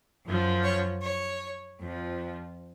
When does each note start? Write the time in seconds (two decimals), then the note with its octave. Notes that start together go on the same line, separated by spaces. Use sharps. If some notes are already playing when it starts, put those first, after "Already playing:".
0.24 F#2 F3
0.63 C#5
1.02 C#5
1.79 F2 F3